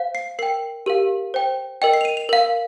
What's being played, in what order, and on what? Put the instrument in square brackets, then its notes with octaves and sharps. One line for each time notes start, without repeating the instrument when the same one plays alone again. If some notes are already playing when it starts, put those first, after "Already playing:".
Already playing: [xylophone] C5 F5
C7
A#4 G5 C7
G4 A#4 F5
C5 G5
A#4 D#5 G5
C7
F7
D#7
F7
A#4 F5